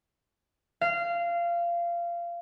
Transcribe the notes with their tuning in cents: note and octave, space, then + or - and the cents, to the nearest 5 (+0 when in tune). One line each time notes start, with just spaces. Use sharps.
F5 -20